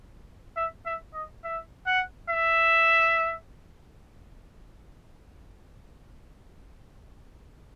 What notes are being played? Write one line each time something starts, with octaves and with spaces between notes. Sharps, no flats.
E5
E5
D#5
E5
F#5
E5